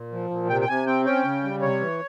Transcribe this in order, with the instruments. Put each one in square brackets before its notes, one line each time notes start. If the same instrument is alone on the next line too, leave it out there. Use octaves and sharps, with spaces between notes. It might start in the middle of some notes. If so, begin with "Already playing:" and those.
Already playing: [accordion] A#2
F3
A#2
C3 G5
G5
C3 G#5
C4 G5
C#4 G5
C#3
G3
C3 C#5
E3